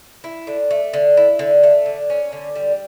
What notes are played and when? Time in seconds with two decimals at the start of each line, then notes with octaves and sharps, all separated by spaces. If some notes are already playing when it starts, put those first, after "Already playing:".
0.24 E4
0.47 D3
0.71 A3
0.94 D3
1.17 E4
1.39 D3
1.63 A3
1.86 D3
2.10 C#4
2.32 D3
2.55 G3